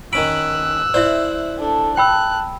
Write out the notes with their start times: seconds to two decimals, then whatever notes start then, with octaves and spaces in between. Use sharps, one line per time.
0.13 D#3 C#4 B5 E6 F#6 D7
0.94 E4 C5 D5 E5
1.59 D4 A4
1.97 G5 A5 B5 E6 F#6